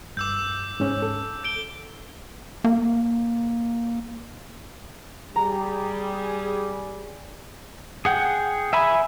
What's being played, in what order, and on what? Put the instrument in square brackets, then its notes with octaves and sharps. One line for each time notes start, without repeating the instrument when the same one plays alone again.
[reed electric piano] G2 [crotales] D6 E6 G6
[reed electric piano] G#2 C#4
A4
[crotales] G6 D7 G7
[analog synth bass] A#3
[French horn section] G3 G#4 [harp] A#5
[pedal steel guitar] G#4 F#5 G5
E5 G#5 B5